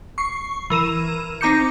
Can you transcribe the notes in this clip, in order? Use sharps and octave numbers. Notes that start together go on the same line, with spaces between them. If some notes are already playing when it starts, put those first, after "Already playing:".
C#6 C7
E3 A#4 D#7 E7
C4 D#4 A#5 D6 G6 C#7